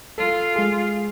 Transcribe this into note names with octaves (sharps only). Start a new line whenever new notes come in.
F4 A4
G#3 G#4